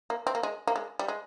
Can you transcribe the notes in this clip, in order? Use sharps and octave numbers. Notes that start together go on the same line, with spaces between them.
A#3
C4
A#3
G#3
A#3
G#3
G3
G#3